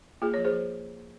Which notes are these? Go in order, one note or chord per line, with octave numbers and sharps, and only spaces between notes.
A#3 F4 G#4
F3 C#5
G#4 C5
F3